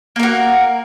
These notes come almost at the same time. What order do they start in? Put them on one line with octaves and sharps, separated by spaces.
A#3 A#4 F#4